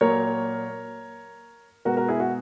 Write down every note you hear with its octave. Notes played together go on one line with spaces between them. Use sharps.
A#2 F#3 A#3 A#4 C#5
B2 G#3 B3 F#4 A#4
F#4 A#4
E4 G#4
F#4